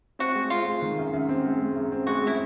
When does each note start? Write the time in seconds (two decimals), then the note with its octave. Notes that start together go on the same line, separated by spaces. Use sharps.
0.19 C4 F#4
0.35 G#3
0.50 C4 F4
0.66 G#3
0.82 D#3
0.98 F#2
1.13 F#2
1.29 C4
1.45 G#3
1.60 G#3
1.76 F#2
1.92 C4
2.07 G#3 F#4
2.23 G#3 E4